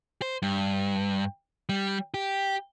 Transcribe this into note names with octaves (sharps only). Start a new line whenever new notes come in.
C5
G2
G3
G4